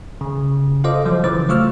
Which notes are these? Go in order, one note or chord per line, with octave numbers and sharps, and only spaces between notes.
C#3
F4 A4 C5 D#5 F5 D6
F3 F#3
C#3 E3 C5 D6 A6
F#3 A3 F4 C#6 E6 F6